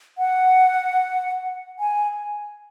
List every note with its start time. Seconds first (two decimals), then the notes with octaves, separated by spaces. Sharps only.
0.18 F#5
1.79 G#5